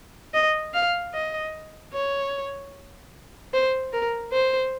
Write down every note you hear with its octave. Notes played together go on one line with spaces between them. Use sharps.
D#5
F5
D#5
C#5
C5
A#4
C5